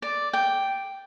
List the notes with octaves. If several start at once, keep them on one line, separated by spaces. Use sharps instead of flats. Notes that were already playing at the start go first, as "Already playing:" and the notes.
D5
G5